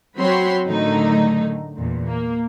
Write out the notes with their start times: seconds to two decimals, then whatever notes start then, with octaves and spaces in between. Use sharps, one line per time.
0.17 F#3 C4 F#4 C#5 B5 C6
0.66 A2 D3 D#3 F#3 A3 D#4
1.76 E2 A#2
2.07 A#3